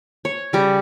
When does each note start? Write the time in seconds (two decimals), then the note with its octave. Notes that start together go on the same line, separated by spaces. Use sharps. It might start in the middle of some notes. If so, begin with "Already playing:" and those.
0.25 C#5
0.53 C#3 G3